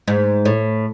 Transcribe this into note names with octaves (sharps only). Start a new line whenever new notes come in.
G#2
A2